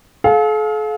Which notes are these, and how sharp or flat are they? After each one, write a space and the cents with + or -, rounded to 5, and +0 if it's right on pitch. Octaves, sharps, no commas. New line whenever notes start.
A4 -45 F5 +15